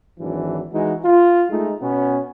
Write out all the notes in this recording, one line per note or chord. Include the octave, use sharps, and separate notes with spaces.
G#1 E3 F#3 D4
E3 G#3 D#4 F#4
F4
G#3 A3 D#4
B2 B3 C#4